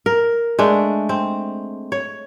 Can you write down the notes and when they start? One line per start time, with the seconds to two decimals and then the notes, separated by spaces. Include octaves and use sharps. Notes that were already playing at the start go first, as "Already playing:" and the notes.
0.06 A#4
0.59 G#3 A3 D4
1.09 C4
1.92 C#5